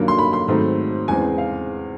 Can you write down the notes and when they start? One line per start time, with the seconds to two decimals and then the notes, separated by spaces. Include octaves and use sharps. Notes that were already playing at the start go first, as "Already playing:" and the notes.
Already playing: G2 D#3 F#3 A#3
0.08 C6
0.19 B5
0.33 C6
0.48 G#2 D#3 F#3 A3 C4
1.08 E2 C#3 E3 G#3 C4 G#5
1.38 F5